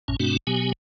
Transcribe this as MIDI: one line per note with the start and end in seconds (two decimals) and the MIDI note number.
0.08 0.16 33
0.08 0.16 42
0.08 0.16 46
0.08 0.16 61
0.20 0.37 43
0.20 0.37 47
0.20 0.37 57
0.20 0.37 60
0.20 0.37 62
0.20 0.37 66
0.47 0.72 47
0.47 0.72 54
0.47 0.72 59
0.47 0.72 67
0.47 0.72 80